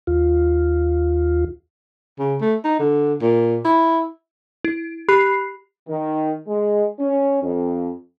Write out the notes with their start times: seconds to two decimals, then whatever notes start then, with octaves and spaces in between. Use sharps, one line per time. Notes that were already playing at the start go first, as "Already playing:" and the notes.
0.07 D#2 F4
2.19 C#3
2.41 A3
2.65 D#4
2.79 D3
3.22 A#2
3.65 E4
4.64 E4
5.09 G4 B5 F#6 C7
5.89 D#3
6.48 G#3
7.00 C#4
7.43 F2